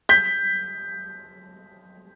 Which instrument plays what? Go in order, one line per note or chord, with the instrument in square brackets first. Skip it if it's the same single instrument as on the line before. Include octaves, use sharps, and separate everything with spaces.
[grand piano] G6 B6